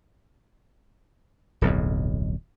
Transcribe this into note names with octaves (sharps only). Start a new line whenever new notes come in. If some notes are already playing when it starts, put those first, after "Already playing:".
D1 B1 F2